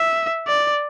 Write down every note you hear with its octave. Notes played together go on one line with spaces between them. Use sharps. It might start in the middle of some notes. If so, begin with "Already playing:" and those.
Already playing: E5
D5